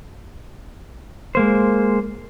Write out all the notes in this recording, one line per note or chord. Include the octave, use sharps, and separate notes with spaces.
G#3 A#3 C5